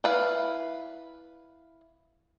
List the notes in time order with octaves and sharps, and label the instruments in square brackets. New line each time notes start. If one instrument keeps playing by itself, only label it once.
[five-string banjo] E4 B4 F5